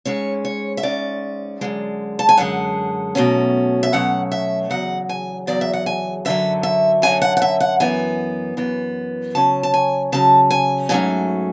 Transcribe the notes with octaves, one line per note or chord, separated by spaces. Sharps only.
G#2 G#3 C#4 C#5
C#5
E5
G#2 G#3 C#4 D5
F#2 D3 G#3
A5
G#5
F#2 D3 G#3 F#5
B2 F#3 A3 C#4
E5
B2 F#3 A3 C#4 F#5
E5
E2 C#3 F#3 F#5
G#5
E2 C#3 F#3 D5
E5
F#5
G#5
F#2 D3 F#3 E5
E5
F#2 D3 F#3 G#5
F#5
F#5
E5
F#5
F#2 E3 B3 G#5
F#2 E3 B3
C#3 F#3 C#4 A5
A5
G#5
C#3 F#3 C#4 A5
G#5
G#2 F#3 A3 C#4 G#5